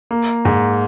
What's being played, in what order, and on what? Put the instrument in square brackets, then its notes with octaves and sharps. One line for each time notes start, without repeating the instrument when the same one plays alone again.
[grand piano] A#3
G#2